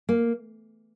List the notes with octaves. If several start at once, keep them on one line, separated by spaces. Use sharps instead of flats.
A#3